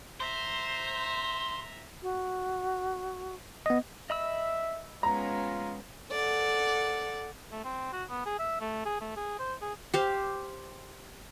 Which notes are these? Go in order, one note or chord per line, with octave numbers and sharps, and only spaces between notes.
C5 E5 A#5
F#4
B3 D#5
D#5 E5 B5 E6
G#3 B3 C#4 F4 A#5
A4 D5 F#5
A3
C4
F#4
B3
G#4
E5
A3
G#4
A3
G#4
C5
G#4
G4 C5 F5